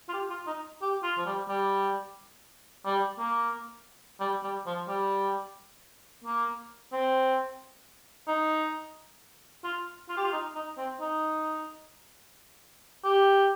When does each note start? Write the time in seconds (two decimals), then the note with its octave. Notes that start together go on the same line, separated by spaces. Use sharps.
0.09 F4
0.13 G4
0.30 F4
0.47 D#4
0.82 G4
1.03 F4
1.18 F3
1.26 G3
1.48 G3
2.86 G3
3.19 A#3
4.20 G3
4.43 G3
4.67 F3
4.88 G3
6.25 A#3
6.93 C4
8.28 D#4
9.64 F4
10.09 F4
10.17 G4
10.24 F4
10.33 D#4
10.55 D#4
10.78 C4
11.01 D#4
13.04 G4